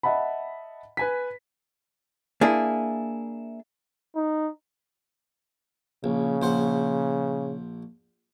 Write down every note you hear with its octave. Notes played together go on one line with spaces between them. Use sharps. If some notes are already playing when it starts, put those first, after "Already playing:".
D#5 E5 F#5 A5 B5
B4 G#5 B6
A#3 D4 E4 G#4
D#4
A#1 C#3
A#1 C5 F#5